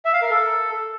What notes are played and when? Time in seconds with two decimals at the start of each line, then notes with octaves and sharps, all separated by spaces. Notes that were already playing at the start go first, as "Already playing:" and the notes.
0.05 E5
0.13 F5
0.22 A#4
0.30 A4